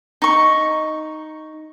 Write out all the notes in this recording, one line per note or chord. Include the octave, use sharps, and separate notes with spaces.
D#4 C#6